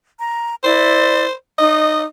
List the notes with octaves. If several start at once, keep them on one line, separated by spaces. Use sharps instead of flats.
A#5
E4 C5 D5
D#4 D#5